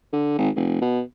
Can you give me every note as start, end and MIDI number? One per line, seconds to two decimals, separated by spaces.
0.13 0.35 50
0.38 0.50 32
0.56 0.78 29
0.82 1.01 47